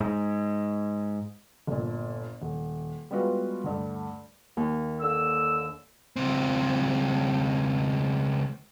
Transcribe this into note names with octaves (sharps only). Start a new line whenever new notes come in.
G#2
G1 A#2
D#1
G3 G#3 B3 F4 F#4 B4
D2 G2 A3
D#2
D3 A#3 E6
C#2 C4